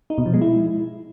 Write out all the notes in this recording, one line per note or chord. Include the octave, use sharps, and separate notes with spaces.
D#4
B2
F3
G#3
E4